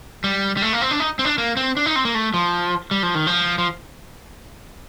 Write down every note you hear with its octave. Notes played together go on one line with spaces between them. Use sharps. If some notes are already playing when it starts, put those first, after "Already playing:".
G3
G3
A3
A#3
C4
D4
D#4
C4
D4
A#3
C4
D4
D#4
C4
A#3
A3
F3
G3
F3
D#3
F3
F3